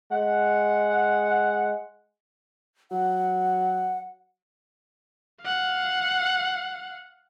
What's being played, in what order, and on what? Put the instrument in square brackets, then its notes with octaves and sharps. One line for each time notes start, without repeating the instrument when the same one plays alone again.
[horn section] G#3 F#5
[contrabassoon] F#3 [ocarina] F#5
[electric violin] F5 F#5